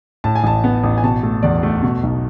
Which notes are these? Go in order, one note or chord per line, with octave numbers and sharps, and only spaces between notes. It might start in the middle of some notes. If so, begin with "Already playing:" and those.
A2 A5
G#5
A1 A5
B3
A1
G#5
B2 A5
A3
E2 D5
A3
B2
B1